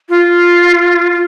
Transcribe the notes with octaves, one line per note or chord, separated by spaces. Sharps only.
F4
F4